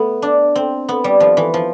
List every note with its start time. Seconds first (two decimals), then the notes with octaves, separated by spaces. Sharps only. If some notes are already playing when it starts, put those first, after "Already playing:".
Already playing: A3 B3
0.22 D4
0.55 C4
0.89 B3
1.04 G3
1.20 F3
1.37 E3
1.54 F3